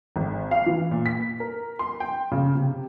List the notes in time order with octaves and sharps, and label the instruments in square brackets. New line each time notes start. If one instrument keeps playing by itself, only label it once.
[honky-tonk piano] G#1
F5
E3
A#2
B6
A#4
C6
G5
C#3
C3